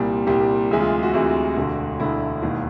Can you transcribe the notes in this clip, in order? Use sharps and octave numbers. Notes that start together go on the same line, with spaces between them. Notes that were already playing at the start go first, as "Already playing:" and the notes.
Already playing: C2 A#2 G3
C2 A#2 G3 G4
D2 C3 E3 G#3
F4
F#4
D2 C3 E3 G#3 F#4
E1 D2 D3
E1 D2 D3 E4
E1 D#2 D#3